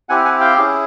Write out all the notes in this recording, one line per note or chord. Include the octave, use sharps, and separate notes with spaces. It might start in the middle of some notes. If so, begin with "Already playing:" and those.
C4 E4 G4 F#5 G#5
F#5 G#5
F5 G5
C#4 E4 G#4